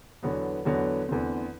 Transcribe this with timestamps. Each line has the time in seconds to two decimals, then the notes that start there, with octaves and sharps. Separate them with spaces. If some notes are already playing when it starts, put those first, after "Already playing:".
0.23 E2 D3 F#3 B3
0.65 E2 D3 F#3 B3
1.09 E2 D3 A3 C4